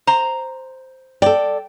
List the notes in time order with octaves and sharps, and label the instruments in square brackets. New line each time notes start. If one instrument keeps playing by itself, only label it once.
[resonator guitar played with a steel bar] C5 A#5
[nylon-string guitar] A4 D5 [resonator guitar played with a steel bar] G5